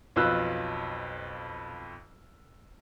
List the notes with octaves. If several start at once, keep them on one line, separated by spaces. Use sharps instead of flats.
B1 F2 F4 B4 E6 F#6